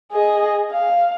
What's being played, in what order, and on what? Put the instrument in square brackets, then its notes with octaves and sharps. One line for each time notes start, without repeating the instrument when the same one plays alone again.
[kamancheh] G#4 D#5
F5